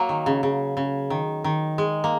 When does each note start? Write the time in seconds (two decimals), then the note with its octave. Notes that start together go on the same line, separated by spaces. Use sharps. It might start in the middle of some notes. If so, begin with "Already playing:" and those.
Already playing: F#3 A#3
0.09 D#3
0.26 C#3
0.43 C#3
0.77 C#3
1.10 D#3
1.44 D#3
1.78 G#3
2.04 A#3